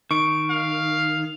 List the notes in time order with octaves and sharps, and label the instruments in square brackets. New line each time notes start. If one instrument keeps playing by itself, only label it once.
[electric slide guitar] D#3 [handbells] C#6 D7
[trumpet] F5